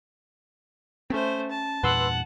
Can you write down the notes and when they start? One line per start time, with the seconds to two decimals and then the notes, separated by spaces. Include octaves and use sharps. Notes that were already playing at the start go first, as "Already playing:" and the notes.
1.10 A3 C4 C#4 C5
1.51 A5
1.83 E2 G2 A#2 B4 F#5 C6 E6